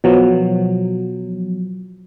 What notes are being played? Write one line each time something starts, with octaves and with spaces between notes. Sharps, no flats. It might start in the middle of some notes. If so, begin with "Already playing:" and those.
B2 F3 F#3